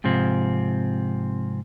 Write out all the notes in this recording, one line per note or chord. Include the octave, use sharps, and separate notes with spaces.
G#2 C3 F3 C4